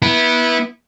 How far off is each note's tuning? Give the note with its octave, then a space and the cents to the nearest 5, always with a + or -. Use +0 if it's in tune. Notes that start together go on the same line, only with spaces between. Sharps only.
B3 -20 E4 -15